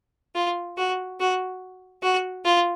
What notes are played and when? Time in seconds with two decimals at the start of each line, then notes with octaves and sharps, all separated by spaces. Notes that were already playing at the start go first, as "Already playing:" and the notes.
0.35 F4
0.77 F#4
1.19 F#4
2.02 F#4
2.45 F4